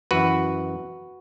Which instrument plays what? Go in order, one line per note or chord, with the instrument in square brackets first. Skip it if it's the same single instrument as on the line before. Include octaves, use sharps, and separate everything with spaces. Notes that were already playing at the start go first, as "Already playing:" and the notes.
[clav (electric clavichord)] F#2 E3 F#4 B4